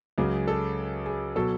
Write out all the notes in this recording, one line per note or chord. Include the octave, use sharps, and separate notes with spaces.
C#2 C#3 F#3 G#4
A4
G#4
B2 F#3 A4